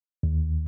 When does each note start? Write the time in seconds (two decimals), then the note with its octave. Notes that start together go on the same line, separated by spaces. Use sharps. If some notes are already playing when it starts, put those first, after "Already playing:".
0.23 D#2